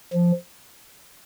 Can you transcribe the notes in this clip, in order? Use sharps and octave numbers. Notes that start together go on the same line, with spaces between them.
F3